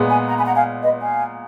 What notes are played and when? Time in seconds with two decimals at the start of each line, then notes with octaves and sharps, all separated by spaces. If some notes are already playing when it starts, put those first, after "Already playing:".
Already playing: A#2 G#3 B3
0.09 G#5 B5
0.28 F#5 A#5
0.36 G#5 B5
0.46 F#5 A#5
0.55 F5 G#5
0.83 B4 D#5
1.01 F5 G#5